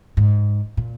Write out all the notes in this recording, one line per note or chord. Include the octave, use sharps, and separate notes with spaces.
G#2
A#2